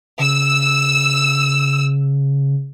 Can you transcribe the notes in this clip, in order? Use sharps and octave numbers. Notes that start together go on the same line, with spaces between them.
C#3 E6